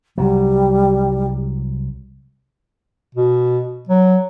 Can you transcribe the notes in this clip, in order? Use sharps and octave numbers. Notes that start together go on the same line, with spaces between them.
C2 F#3 G3
B2
F#3